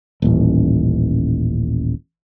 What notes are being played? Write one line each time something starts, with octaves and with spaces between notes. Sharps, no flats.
D#1 A1